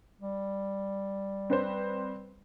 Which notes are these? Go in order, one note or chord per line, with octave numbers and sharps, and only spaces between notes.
G3
C4 B4 C5